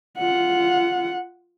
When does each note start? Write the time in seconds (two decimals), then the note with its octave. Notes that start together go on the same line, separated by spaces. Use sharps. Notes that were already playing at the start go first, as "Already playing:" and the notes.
0.18 F4 F#5